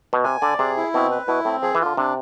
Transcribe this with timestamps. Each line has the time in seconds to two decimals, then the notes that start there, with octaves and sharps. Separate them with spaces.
0.13 B2
0.24 C3 G#5
0.41 D3 D5
0.59 C3 G#4
0.77 E4
0.94 B2 C4
1.11 B4
1.28 B2 E4
1.45 A2 C4
1.62 F3 G#4
1.75 E3
1.80 F4
1.86 D3
1.97 C3 D4